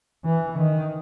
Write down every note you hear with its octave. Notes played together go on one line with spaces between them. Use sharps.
E3
D#3